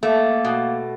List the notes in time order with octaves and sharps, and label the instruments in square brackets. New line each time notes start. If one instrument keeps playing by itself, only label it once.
[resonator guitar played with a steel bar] A3 [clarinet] A#3
[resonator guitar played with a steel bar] B2